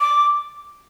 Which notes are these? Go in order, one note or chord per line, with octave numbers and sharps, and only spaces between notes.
D6